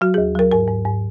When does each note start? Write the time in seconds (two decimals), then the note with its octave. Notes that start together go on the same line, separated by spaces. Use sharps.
0.01 F#3 F#4
0.14 G#4
0.18 D#2
0.35 F#3 A#4
0.52 G#2 A#4
0.68 G#2
0.85 G#2